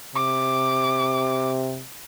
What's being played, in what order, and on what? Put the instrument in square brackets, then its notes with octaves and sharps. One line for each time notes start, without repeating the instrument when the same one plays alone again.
[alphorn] C3 [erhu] D6